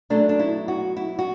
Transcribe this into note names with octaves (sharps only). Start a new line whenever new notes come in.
B2 F#3 A3 D4
D4
E4
F#4
E4
F#4